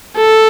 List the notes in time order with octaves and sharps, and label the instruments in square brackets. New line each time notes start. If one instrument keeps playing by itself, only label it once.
[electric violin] A4